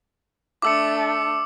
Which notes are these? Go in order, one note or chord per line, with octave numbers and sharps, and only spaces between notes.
A3 D4 D6 E6 C#7